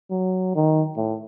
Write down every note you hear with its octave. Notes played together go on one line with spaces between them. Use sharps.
F#3
D#3
A2